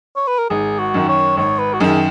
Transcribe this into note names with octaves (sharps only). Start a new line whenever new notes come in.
C#5
B4
A#4
G#1 G#4
F#4
F#2 D#3
C#5
G#1 C#5
B4
F#4
F#2 D#3 G#4